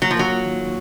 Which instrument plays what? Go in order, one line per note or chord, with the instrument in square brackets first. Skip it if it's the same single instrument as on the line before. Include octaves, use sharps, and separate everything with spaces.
[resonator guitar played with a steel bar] F#3 [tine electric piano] A#3
[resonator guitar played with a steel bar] F3
[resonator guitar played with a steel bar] F#3 [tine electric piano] A#3
[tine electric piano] F4
D#3
D#3